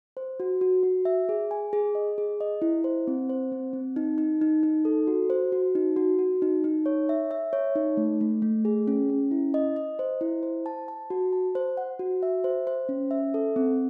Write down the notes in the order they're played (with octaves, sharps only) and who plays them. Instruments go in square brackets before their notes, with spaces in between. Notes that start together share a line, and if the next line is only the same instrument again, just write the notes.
[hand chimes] C5
F#4
F#4
F#4
E5
G#4
G#5
G#4
D#5
G#4
D#5
E4
C5
C4
C5
C4
C4
D#4
D#4
D#4
D#4
A4
F#4
C5
F#4
D#4
F#4
F#4
D#4
D#4
C#5
E5
E5
C#5
D#4
A3
A3
A3
G#4
C#4
C#4
E4
D#5
D#5
C5
E4
C5
A5
A5
F#4
A5
C5
F#5
F#4
E5
C5
C5
C#4
E5
A4
C4